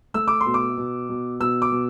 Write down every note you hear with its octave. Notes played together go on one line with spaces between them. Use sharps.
A3 E6
D6
C6
B2
D6
B2
B2
B2 E6
D6
B2